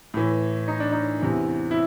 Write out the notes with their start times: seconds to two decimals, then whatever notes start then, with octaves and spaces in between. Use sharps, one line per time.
0.14 A2 E3
0.68 D#4
0.80 D4
0.92 D#4
1.21 E2 C3 E3
1.71 E4